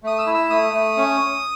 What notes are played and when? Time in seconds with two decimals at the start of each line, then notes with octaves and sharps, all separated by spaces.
0.03 A3 D#6
0.18 E6
0.27 E4
0.34 E6
0.50 A3 D#6
0.73 A3
0.97 C#4